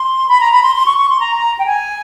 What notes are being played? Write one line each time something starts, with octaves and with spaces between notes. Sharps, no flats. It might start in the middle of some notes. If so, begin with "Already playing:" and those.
Already playing: C6
B5
A#5
B5
C6
C6
C#6
C#6
C6
A#5
A#5
G5
G#5